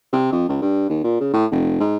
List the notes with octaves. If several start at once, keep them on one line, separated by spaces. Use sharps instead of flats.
C3
F2
C#2
G2
D#2
A#2
C#3
A2
F1
G#2